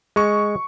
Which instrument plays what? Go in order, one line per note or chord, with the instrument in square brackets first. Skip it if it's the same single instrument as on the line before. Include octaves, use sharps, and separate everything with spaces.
[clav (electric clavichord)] G#3 [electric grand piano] C#6